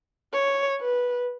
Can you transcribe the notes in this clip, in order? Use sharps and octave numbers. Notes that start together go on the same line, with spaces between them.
C#5
B4